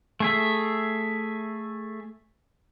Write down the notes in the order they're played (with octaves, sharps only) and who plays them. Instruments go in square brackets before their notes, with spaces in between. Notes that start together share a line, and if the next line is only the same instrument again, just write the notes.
[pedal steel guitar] A3 G#4 E5